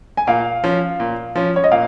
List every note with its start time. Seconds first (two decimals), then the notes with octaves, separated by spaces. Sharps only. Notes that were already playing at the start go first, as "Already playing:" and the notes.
0.17 G#5
0.27 A#2 F5
0.64 F3 C#4
1.00 A#2
1.36 F3 C#4
1.56 C#5
1.64 D#5
1.71 A#2 F5